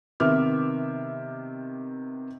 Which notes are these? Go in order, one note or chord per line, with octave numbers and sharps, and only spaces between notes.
C3 D#3 B3 E5 D6 F6